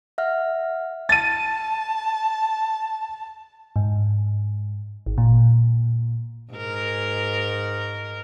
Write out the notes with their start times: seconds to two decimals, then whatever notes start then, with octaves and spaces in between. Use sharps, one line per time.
0.18 E5 F#5 F6
1.09 A5 A6 D#7
3.76 G#2
5.06 G#1
5.18 A#2
6.53 G#2 A#4